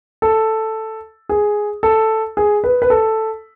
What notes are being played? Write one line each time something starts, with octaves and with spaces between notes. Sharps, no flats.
A4
G#4
A4
G#4
B4
B4
A4